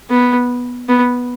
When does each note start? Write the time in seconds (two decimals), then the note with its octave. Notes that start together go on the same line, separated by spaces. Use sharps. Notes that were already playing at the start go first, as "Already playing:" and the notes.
0.10 B3
0.88 B3